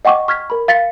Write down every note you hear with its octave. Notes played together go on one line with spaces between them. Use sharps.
D#5 F#5 G5 C#6 D6
C#6 F6 G#6 B6
A#4 B5
F5 A6 B6 C#7